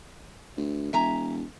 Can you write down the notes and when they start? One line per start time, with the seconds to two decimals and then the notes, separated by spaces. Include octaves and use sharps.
0.57 D2
0.93 E1 E5 G#5 A#5